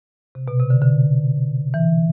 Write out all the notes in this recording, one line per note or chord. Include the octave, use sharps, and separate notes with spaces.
C3
B2
C3
D3
D3
E3